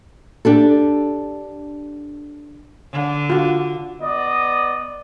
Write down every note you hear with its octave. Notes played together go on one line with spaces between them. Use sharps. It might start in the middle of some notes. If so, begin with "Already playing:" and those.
D4 G4 A4
D3
F4 F#4
B3 D5 D#5